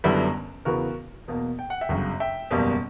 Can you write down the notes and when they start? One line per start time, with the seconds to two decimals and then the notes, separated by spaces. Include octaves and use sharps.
0.04 F#1 F#2 D3 G3 B3 E4
0.65 E2 C#3 E3 B3 F#4 A#4
1.28 E2 B2 A#3
1.59 G5
1.70 F#5
1.81 E5 G5
1.89 G1 F#2 C#3
2.20 E5 G5
2.51 F#1 E2 B2 G3 A#3